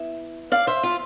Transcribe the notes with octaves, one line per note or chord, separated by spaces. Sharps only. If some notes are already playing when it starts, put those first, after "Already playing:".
Already playing: B3 E4 E5
D5 F5
C5 E5
F4